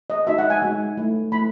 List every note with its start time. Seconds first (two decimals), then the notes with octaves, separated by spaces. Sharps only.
0.10 D#5
0.27 G#3 D#4 F#4 E5
0.38 F#5
0.50 G#5
0.62 G#3 D#4 F#4
0.97 A3 E4
1.32 A3 E4 B5